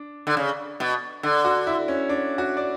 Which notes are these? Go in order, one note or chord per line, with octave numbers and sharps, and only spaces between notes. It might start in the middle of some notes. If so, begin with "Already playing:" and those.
Already playing: D4
D3
C#3
B2
D3
F#4
E4
C#4
D4
F#4
D5